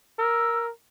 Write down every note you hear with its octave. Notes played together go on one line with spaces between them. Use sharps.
A#4 E6